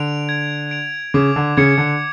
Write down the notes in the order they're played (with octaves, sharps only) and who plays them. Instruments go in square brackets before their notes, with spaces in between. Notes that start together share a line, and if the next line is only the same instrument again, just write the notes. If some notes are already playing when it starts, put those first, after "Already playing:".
Already playing: [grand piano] D3 [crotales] D7 F7
[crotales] G#6
D7 F7
[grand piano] C#3 [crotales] D6
[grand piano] D3
[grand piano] C#3 [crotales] G#6 C#7
[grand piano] D3